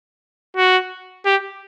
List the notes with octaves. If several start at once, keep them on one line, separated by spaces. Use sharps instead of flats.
F#4
G4